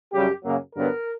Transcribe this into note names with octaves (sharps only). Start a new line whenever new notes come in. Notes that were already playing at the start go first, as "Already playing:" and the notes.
F#2 C#3 G3 G4
F#2 C#3 F#3 A#3
G2 D3 F#3 B3 A#4